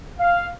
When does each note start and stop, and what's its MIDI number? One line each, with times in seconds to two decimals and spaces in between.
0.18 0.47 77